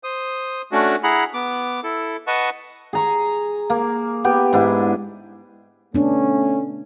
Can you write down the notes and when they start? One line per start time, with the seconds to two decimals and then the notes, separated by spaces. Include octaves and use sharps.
0.04 C5 D#6
0.72 A3 C#4 D4 F#4
1.04 E4 G#4 F#5 A#5 B5
1.34 B3 D6
1.83 E4 A4
2.27 B4 D#5 F#5 A5 C#6
2.93 G#4 A#5 C#6
3.70 A#3
4.24 B3 G4
4.53 G#2 D4 E4
5.94 A3 B3 C#4 D4